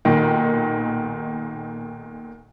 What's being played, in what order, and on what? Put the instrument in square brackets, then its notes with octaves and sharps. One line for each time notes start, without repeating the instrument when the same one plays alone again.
[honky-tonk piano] B1 A#2 D#3